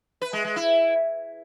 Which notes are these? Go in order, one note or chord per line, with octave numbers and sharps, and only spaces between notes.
B4
G#3
G#3
E4